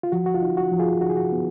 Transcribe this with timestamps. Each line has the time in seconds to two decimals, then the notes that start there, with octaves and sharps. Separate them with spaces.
0.03 F4
0.12 F3 F#4
0.26 F#4
0.34 F4
0.42 D#4
0.57 F#4
0.72 F3
0.79 F4 G#4
1.01 D#4 F#4
1.10 G#4
1.17 F#4
1.32 B3